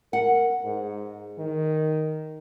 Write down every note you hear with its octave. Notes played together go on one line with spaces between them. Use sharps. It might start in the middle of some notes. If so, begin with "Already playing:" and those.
A#4 F#5
G#2
D#3